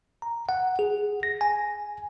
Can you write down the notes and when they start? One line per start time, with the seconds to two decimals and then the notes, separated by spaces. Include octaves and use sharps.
0.22 A#5
0.49 F#5
0.79 G#4
1.23 A#6
1.41 G#5